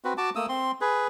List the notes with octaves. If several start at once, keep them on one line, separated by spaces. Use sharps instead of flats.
C4 F#4 B4
F#4 A5 D6
A3 A#3 D#6 E6
C4 C6
G#4 B4